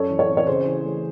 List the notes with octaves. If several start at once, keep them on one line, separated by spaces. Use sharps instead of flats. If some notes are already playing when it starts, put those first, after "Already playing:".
Already playing: F#2 A4 C#5
E3
A4 C#5
C4
C#5
C#3 G#4 C5
E3
A3